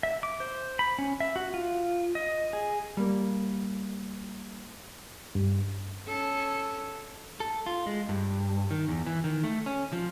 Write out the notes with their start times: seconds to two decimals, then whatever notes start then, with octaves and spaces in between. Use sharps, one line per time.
0.03 E5
0.23 D6
0.40 C5
0.79 B5
0.98 C#4
1.20 E5
1.36 F#4
1.54 F4
2.15 D#5
2.53 G#4
2.97 G3 A#3
5.35 G2
6.07 C#4 A4
7.40 A4
7.66 F4
7.86 G#3
8.09 G2
8.71 D#3
8.88 E2
9.06 E3
9.24 D#3
9.44 A3
9.66 C#4
9.93 F3